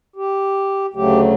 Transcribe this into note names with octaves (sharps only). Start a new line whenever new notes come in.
G4
D2 C#3 F#3 A3 G4